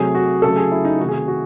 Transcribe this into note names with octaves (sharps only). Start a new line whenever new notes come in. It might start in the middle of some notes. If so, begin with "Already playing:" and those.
Already playing: C3 F#3 A3 G#4
F#4
C#3 F#3 A3 A4
G#4
E4
D#4
C3 D#3 A3 F#4
G#4
F#4